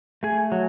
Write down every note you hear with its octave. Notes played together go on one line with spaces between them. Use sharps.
A3 G#4 G#5
F#3